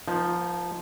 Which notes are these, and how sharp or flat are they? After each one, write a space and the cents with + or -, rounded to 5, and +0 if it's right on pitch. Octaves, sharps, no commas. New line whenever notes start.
F3 +0 B3 -45 D#4 +0